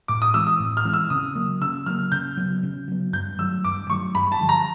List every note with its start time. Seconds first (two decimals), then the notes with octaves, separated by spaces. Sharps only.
0.08 A2 D6
0.22 D#6
0.34 E3 G#3 C4 E6
0.47 D#6
0.60 A2
0.77 F6
0.85 E3 G#3 C4
0.94 E6
1.10 C#3 D#6
1.35 F#3 A#3
1.61 C#3 E6
1.86 F#3 A#3 F6
2.12 C#3 G6
2.37 F#3 B3
2.63 C#3
2.88 F#3 B3
3.13 G2 G6
3.38 D#3 F#3 A3 E6
3.64 G2 D6
3.89 D#3 F#3 A3 C#6
4.15 G2 B5
4.32 A5
4.40 D3 F3
4.49 A#5